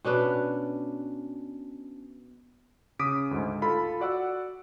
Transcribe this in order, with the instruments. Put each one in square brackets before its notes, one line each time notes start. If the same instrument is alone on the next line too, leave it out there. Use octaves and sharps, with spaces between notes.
[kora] B2 C#4 D4 B4
[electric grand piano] C#3 D6 D#6 B6 D7
D2 G#2
F4 A4 B5
F#4 D5 F#5 E6